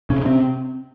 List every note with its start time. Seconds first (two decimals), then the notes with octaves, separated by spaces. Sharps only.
0.10 C3 C#4
0.25 C3 C4